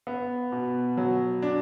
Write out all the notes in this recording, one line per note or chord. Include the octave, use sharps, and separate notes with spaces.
B3
B2
F#3
D4